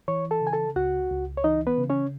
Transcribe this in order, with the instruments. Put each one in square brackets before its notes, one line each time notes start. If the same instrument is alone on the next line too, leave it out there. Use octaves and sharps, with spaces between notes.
[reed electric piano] E3 C#5 C#6
A4 A5
C#3
G#5
A4 A5
C#2 F#4 F#5
C#2
C#5
E3 D#4 D#5
B3 B4
C#3
C#4 C#5